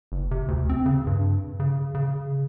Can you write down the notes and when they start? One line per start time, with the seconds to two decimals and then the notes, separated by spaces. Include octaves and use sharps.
0.12 F#1
0.31 C3
0.48 D2
0.69 C4
0.86 C#3
1.07 G2
1.60 C#3
1.95 C#3